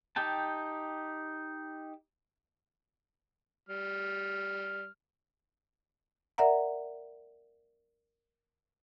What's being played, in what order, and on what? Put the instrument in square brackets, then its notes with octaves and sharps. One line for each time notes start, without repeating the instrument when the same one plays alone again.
[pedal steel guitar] D#4 G4 G5 A5
[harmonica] G3 F6
[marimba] A#4 D5 E5 F#5 A#5